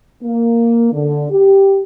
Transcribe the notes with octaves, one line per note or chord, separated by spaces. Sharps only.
A#3
D3
G4